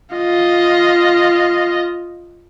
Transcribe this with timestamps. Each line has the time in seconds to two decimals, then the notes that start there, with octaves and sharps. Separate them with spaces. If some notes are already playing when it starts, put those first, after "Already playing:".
0.16 F4 D#5